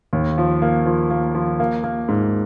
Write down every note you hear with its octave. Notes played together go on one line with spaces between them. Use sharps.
D#2
F3
A#3
F3
A#3
F3
A#3
A#3
G#2